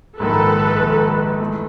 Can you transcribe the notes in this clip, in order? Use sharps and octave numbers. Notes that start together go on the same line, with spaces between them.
A#1 G#2 D#3 A4 B4
A#1 G#2 D#3
E3 A3